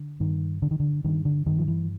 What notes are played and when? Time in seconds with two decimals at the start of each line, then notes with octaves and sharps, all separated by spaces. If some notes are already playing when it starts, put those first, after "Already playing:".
Already playing: D3
0.20 G2 D#3
0.62 G2 D3
0.71 D#3
0.80 D3
1.04 G2 D#3
1.25 D3
1.46 G2 D#3
1.58 F3
1.68 E3